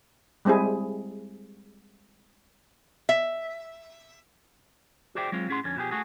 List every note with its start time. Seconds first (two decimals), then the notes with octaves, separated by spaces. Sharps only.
0.45 G3 G#3 C4 E4 G#4
3.09 E5
5.15 F#4 G#4 C5 D5 E5 G5
5.32 F#3 G#3 C4 F4
5.49 A2 C#4 G#4 F#5 C6
5.64 F2 D3 C#4
5.76 B2 F3 E4 G4 G#4
5.91 A3 F#4 G#4